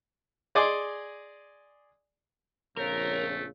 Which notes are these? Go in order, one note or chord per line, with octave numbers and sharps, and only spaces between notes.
G#4 D5 D#5 G#5 C6 D6
A#1 F2 C#3 A3 A#4 C#5